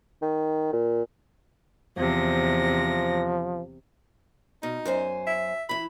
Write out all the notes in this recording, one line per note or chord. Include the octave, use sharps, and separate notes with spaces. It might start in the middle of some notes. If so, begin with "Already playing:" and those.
D#3
A#2
E2 C3 F3 A#6
B2 D#4
F#2 C5 G#5
E5
E3 E4 B5